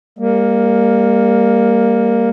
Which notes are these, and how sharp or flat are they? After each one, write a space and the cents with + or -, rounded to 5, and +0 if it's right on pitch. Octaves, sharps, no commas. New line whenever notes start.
G3 +40 A#3 +0